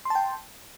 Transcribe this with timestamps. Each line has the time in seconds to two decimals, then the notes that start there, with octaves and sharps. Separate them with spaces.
0.05 C6
0.10 A5
0.15 G5